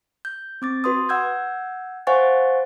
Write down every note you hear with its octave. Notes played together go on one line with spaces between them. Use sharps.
G6
C4 D6 A6
F#4 B4 C6 D#6
F#5 E6 G6 G#6
C5 F5 F#5 G#5 C#6 A6